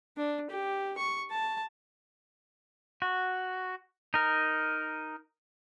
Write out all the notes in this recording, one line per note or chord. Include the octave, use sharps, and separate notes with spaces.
D4
G4
C#6
A5
F#4
D#4 A#4